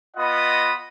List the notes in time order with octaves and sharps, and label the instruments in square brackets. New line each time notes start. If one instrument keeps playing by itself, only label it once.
[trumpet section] B3 F4 D#5 F#5 B5 D#6